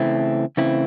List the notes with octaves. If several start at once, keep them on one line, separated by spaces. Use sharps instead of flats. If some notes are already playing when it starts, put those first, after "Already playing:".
Already playing: C#3 E3 A3 C4 E4
C#3 E3 A3 C4 E4